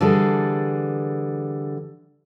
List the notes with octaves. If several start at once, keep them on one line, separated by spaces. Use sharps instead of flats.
D3 E3 G3 G#4 A4